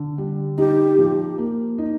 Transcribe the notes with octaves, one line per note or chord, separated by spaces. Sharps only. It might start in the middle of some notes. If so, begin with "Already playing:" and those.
Already playing: D3
G3
D#4 G4
F3
A#3
D#4